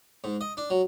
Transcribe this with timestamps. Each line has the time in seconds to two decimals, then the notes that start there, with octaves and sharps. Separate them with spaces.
0.24 G#2
0.41 D#5
0.57 D4
0.70 F#3